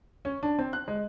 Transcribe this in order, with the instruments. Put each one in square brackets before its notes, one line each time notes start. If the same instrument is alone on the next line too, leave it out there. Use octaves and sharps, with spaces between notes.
[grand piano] C#4
D4
C4
F#6
G#3